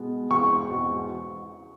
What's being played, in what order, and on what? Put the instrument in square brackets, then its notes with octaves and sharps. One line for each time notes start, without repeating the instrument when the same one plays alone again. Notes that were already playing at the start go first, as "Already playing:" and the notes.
Already playing: [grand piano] B2 G#3 B3
[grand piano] E2 B2 G#3 C4 [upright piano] C#6
[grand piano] E2 B2 G#3 C4